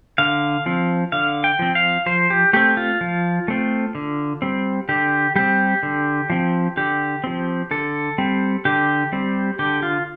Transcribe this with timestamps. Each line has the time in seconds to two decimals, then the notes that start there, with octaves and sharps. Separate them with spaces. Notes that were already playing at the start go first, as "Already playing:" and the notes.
0.18 D3 F5
0.66 F3 C4
1.12 D3 F5
1.44 G5
1.59 F3 C4
1.75 F5
2.06 F3 C5
2.30 G4
2.53 A3 C4 G4
2.77 F4
3.01 F3
3.48 A3 C4
3.95 D3
4.42 G3 C4
4.89 D3 G4
5.36 G3 C4 G4
5.83 D3
6.30 F3 C4
6.77 D3 G4
7.24 F3 C4
7.71 D3 A4
8.18 G3 C4
8.65 D3 G4
9.12 G3 C4
9.59 D3 G4
9.83 F4